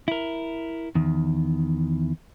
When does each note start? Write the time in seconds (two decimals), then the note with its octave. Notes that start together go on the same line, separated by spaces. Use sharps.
0.08 E4 A#4
0.95 E2 D#3